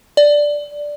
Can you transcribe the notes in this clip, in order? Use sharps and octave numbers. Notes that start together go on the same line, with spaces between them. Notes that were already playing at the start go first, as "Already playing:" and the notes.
D5